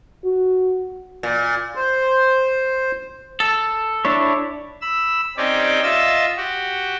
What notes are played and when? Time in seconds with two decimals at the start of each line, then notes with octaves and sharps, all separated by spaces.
0.25 F#4
1.23 A#2
1.75 C5
3.40 A4
4.05 D4 E4 C#5
4.81 B5 E6
5.37 C4 C#4 D#4 G4 C#5 D5
5.83 F4 D#5 E5 E6 A6
6.37 F#4 G4